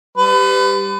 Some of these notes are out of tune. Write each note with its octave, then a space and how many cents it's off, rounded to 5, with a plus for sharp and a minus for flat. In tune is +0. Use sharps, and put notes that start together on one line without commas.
G3 +5 B4 +35